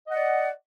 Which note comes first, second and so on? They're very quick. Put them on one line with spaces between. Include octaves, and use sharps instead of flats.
D#5 F#5 D5